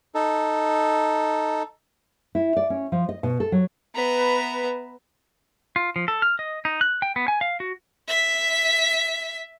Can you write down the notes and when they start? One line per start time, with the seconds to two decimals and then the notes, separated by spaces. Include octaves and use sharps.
0.15 D#4 A4
2.35 E4
2.57 D5
2.70 C#4
2.92 F3
3.09 D#5
3.23 B2
3.40 A4
3.52 F#3
3.95 B3 B4 E5 A#5
5.76 F4
5.96 F3
6.08 A4
6.22 F6
6.39 D#5
6.65 D#4
6.81 F#6
7.02 G5
7.16 B3
7.28 G#5
7.41 F5
7.60 F#4
8.09 E5 B6